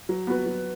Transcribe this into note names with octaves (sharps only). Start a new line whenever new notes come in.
F#3
B3 F#4 B4
F#3